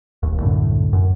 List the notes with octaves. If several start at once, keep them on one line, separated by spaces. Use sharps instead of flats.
E1 D#2
C2 F#2 A2 D3
F#2